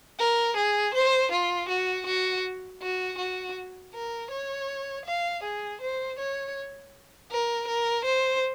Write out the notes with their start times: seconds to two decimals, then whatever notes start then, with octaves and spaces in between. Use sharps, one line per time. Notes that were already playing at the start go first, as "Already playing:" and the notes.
0.19 A#4
0.57 G#4
0.95 C5
1.32 F4
1.69 F#4
2.06 F#4
2.82 F#4
3.18 F#4
3.94 A#4
4.31 C#5
5.06 F5
5.43 G#4
5.81 C5
6.19 C#5
7.31 A#4
7.68 A#4
8.05 C5